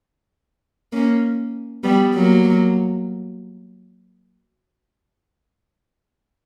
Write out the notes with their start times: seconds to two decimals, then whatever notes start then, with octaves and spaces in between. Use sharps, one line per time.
0.92 A#3 C#4
1.84 G3 B3
2.14 F#3 A#3